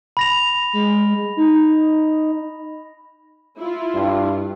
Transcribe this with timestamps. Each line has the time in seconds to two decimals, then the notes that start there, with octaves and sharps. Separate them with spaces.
0.17 B5 A#6 F7
0.73 G#3
1.37 D#4
3.59 E4 F4
3.95 G2